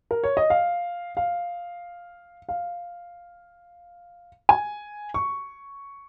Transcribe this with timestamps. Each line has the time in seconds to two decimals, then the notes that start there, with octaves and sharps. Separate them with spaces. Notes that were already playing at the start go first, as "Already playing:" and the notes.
0.11 A#4
0.23 C#5
0.37 D#5
0.50 F5
1.17 F5
2.49 F5
4.49 G#5
5.14 C#6